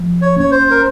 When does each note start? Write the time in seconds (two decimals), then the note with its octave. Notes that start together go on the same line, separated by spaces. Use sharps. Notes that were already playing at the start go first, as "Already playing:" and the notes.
Already playing: F3
0.22 C#5
0.36 A#3 C#4 C#5
0.51 C5
0.71 A#4